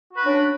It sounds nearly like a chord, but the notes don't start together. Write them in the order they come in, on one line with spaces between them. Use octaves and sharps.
F#4 B4 D4 C#4